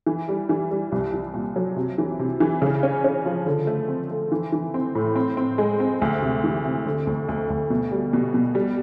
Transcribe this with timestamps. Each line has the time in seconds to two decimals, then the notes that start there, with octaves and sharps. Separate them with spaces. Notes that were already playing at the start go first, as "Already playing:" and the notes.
0.07 E3
0.29 G3
0.49 E3
0.71 G3
0.92 C2
1.13 C2
1.34 A#2
1.56 F#3
1.76 C3
1.98 E3
2.19 C3
2.40 E3
2.62 C#3
2.83 C#4
3.04 C#4
3.26 F3
3.46 D3
3.67 A3
3.88 C4
4.10 A3
4.32 E3
4.52 E3
4.74 C4
4.95 A2
5.15 C4
5.37 C4
5.58 G#3
5.80 C4
6.01 D2
6.22 C3
6.44 E3
6.64 C3
6.86 D3
7.07 D2
7.28 D2
7.50 D2
7.70 B2
7.92 G3
8.13 B2
8.34 B2
8.55 G3